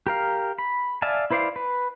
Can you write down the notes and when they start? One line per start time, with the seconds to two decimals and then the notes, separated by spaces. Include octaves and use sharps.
0.07 G4 A#4 F5
0.58 B5
1.02 D5 E5 F5 G#5 A5
1.31 E4 B4 C5 D5 F5
1.56 B4